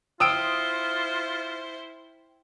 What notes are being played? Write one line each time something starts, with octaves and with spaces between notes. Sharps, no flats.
E4 F4 C5 G5 D#6 E6 D7